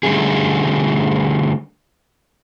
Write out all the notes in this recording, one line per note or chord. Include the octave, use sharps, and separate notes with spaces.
D3 G3 A3 C#4 G#4